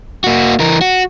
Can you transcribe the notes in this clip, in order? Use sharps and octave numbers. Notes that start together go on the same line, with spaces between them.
A#3 F#4
E3 A#4
F#4